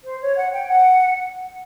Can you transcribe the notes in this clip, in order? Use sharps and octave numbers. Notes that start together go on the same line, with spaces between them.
C5
C#5
F#5
G5
F#5